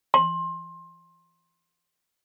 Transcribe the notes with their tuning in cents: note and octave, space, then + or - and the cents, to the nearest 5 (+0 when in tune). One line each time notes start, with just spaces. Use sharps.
C6 +25